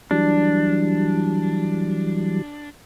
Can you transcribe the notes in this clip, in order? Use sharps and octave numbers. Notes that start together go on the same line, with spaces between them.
E3 F#3 G3 D4